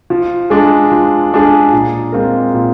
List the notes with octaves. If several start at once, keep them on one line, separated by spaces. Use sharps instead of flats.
F3
G#3 D4 G#4
F3
G#3 D4 G#4
A#2
G#3 C4 F4 A#4
A#2